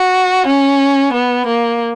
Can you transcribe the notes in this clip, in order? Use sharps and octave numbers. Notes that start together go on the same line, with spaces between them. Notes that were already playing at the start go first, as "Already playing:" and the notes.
Already playing: F#4
C#4
B3
A#3